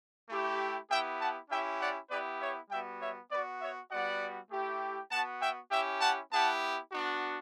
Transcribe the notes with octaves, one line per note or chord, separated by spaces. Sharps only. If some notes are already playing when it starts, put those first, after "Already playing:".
A3 E4 G4
B3 E4 G4 E5 G5
F#5 A5
C#4 E4 G4 E5 G5
D5 F#5
B3 E4 G4 B4 D5
C#5 E5
G3 B3 F#4 E5 G5
C#5 E5
B3 F#4 B4 D5
C#5 E5
G3 B3 F#4 D5 F#5
A3 E4 G4
B3 F#4 F#5 A5
E5 G5
C#4 E4 G4 E5 G5
F#5 A5
B3 E4 G4 F#5 A5
B3 D4 F#4